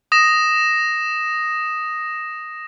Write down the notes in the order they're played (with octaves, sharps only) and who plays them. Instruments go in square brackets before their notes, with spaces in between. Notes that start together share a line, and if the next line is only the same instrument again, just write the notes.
[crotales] D#6 A#6 E7